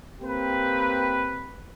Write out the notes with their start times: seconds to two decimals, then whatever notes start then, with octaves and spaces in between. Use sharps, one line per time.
0.22 A#3 C4 G4 B4